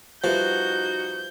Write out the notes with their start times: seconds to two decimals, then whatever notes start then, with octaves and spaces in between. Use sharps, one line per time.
0.24 F3 G3 D#4 F#4 B4 E5 G6